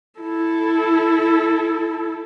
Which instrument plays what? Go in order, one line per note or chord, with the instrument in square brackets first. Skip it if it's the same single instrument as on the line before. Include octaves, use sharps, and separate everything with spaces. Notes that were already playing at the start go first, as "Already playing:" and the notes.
[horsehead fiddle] E4 A4